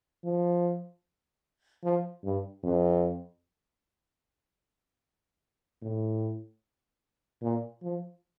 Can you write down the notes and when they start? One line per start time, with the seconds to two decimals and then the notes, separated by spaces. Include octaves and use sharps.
0.24 F3
1.84 F3
2.24 G2
2.63 F2
5.82 A2
7.42 A#2
7.83 F3